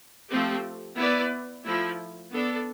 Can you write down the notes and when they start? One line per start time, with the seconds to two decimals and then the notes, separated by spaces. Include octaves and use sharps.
0.29 F3 A3 C4 G4
0.97 B3 E4 B4 D5
1.64 F3 A3 E4
2.32 B3 D4 A4